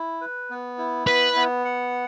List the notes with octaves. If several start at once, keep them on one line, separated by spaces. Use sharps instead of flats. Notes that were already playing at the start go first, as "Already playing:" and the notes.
Already playing: E4
B4
B3
E4
B3 B4
B3
F#5